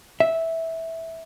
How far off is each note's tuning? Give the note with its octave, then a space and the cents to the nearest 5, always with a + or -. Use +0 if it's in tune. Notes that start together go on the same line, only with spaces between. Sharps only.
E5 -10